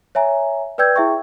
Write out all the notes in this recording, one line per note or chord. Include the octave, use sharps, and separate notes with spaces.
C#5 E5 G#5 A#5
B4 D5 G5 E6 G6 G#6
E4 G#4 E5 G5 C#6